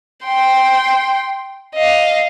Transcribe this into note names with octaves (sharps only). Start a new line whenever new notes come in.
G5 C6
D#5 F5